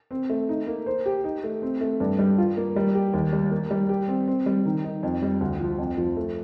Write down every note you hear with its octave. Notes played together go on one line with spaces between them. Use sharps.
C4
A3
D#4
A#3
C5
G4
D#4
A3
C4
A3
G2
G3
F4
A#3
G3
G4
D#2
G3
A#3
G3
G4
C4
C4
G3
D#3
D#4
F2
G3
D2
F3
F2
F3
A3